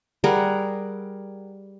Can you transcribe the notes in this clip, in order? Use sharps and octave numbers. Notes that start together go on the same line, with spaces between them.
G3 G#4 A#4 F#5